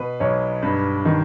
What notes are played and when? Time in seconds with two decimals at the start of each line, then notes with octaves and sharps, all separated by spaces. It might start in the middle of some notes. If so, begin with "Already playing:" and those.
Already playing: B2 B4
0.20 B1 C#5
0.63 G2 B4
1.05 D#3